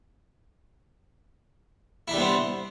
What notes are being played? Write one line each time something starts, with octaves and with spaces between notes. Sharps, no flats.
G3 B3 C4 D4 E4